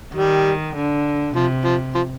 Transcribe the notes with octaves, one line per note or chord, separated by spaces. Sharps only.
D#3 G3
D3
C3 F3
F3
F3